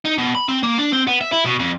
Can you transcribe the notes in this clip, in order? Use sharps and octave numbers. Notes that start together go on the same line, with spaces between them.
D#4
B2
B5
C4
A#3
D4
C4
B3
E5
E4
B2
F2